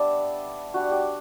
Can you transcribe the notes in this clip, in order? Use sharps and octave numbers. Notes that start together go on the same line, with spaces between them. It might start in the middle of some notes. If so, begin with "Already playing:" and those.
Already playing: G3 B3 D4 D5 E5
G3 D4 F#4
G4